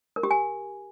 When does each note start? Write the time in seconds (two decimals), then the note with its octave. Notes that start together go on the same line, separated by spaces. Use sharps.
0.16 A#4
0.23 G4
0.31 G#5